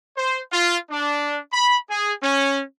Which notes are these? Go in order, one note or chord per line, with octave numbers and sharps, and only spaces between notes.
C5
F4
D4
B5
G#4
C#4